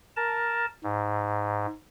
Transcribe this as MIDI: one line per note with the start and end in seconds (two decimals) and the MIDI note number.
0.16 0.66 70
0.16 0.66 81
0.84 1.66 44